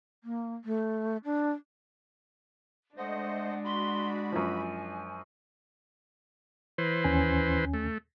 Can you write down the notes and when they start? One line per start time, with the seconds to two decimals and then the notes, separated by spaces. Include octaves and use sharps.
0.24 A#3
0.65 A3
1.24 D4
2.97 G#3 A3 D4 C5 D#5 F#5
3.64 F#4 B5 C6
4.32 F#2 F3 G#5
6.78 E3 B4 C5
7.04 D#2 C#4 G#5
7.74 A3